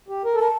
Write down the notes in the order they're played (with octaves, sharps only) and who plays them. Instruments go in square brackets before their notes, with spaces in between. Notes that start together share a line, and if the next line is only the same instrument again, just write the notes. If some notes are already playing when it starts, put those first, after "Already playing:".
[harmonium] G4
A#4
A4
[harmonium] A#4 [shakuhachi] A5